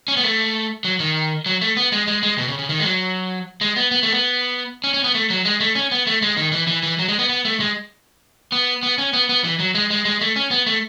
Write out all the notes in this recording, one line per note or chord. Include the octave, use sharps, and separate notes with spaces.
C#4
B3
A3
F#3
D#3
F#3
A3
B3
G#3
G#3
G#3
B2
C#3
C#3
D#3
G#3
F#3
G#3
B3
B3
A3
B3
C#4
C#4
B3
A3
F#3
G#3
A3
C#4
B3
A3
G#3
D#3
E3
E3
E3
F#3
G#3
B3
B3
A3
G#3
B3
B3
C#4
B3
B3
E3
F#3
G#3
G#3
G#3
A3
C#4
B3
A3